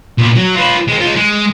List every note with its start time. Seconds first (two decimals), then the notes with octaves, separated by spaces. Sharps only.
0.18 A#2 B3
0.35 F#3
0.55 F4 B4
0.88 G#3 C4
1.00 G#3 F4
1.16 G#3